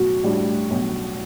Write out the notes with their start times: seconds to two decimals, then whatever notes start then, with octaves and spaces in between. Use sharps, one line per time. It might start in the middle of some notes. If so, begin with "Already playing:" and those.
Already playing: B1 A2 F#4
0.24 A2 G3 D4 G4
0.71 B1